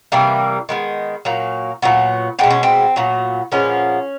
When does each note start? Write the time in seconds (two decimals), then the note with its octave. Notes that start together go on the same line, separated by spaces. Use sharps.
0.12 C3 E3 G3 A#3
0.69 D#3 G#3 B3
1.25 A#2 F#3 A#3
1.82 A#2 F#3 B3
2.39 B2 G#3 B3 C4
2.50 C#4
2.63 C4
2.96 A#2 F#3 B3
3.52 A#2 F3 G#3 B3 C#4